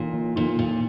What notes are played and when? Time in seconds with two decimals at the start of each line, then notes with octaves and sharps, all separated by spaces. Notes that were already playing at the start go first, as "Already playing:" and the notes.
Already playing: A#2 E3 A#3 D#4
0.14 E3
0.36 A#2 D#4
0.59 A#2 A#3